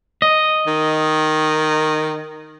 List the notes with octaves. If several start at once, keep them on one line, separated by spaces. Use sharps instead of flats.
D#5
D#3